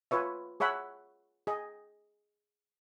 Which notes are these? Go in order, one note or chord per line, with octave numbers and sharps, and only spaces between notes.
F4 B4 C#5 E5
G#4 C#5 E5 F#5 B5
G#4 D#5